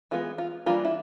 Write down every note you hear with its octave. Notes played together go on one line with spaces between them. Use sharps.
E3 G#3 B3 F4
F4
E3 G3 A#3 D4 F4
E4